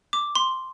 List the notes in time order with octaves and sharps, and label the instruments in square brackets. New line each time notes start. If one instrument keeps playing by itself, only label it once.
[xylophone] D6
C6